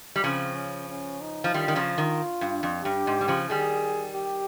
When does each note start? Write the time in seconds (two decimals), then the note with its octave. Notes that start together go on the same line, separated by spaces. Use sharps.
0.16 G3
0.23 C#3 F3 C4
0.56 C#4
0.89 C#4
1.21 D#4
1.44 F3
1.54 D#3 G3 F4
1.68 D#3
1.75 C#3 F3
1.98 D#3
2.41 G2
2.63 F2
2.84 G2 G4
3.07 G#2
3.21 G3
3.28 C#3 F3
3.49 D#3 G3 G#4
4.15 G4